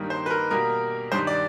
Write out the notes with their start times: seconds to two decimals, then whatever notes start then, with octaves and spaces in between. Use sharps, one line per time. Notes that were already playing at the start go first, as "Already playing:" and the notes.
Already playing: G2 D#3 G3 A#3
0.10 C5
0.26 B4
0.30 A#4
0.51 B2 G3 A#3 A#4
1.12 G2 D#3 G3 C5
1.27 D5